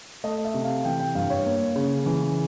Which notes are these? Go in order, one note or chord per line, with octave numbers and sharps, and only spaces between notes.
A3 D#5
E5
C3
F5
E3 G5
G5
G2 F5
C#5
A#3
C#3
E3